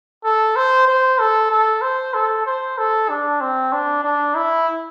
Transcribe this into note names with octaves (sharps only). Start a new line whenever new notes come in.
A4
C5
C5
A4
A4
C5
A4
C5
A4
D4
C4
D4
D4
E4